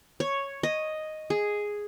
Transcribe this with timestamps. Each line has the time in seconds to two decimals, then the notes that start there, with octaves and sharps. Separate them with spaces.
0.20 C#5
0.63 D#5
1.30 G#4